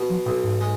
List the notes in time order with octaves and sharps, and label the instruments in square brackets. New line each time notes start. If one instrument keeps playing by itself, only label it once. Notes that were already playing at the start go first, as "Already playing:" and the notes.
Already playing: [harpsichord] B2
[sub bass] F3
[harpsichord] B1 [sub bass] A#2
[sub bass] G#2
[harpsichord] G#3